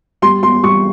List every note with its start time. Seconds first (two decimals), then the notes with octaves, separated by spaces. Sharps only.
0.22 G3 C6
0.42 G3 C6
0.63 G3 C#6